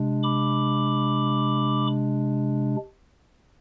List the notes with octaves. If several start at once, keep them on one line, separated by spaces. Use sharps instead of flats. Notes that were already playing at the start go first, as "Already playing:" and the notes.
Already playing: C3 G#3 D4
B5 D6